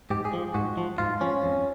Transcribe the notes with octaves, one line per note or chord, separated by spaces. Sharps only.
G#2 G4
G#4
F3
G#2 F#4
F3
G#2 F4
F3 C#4
F2